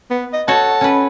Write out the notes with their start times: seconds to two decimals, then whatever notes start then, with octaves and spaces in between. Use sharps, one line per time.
0.10 B3
0.33 D#5
0.48 F#4 A4 C#5 A5
0.81 C#4 B4